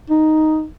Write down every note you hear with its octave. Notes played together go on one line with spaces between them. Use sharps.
D#4